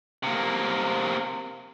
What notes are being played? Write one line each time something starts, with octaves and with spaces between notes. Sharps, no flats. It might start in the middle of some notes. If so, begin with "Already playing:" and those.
C3 A#3